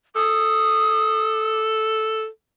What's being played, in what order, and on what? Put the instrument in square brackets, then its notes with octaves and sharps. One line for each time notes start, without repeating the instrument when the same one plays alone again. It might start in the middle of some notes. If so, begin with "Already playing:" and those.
[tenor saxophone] A4 [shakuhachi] D#6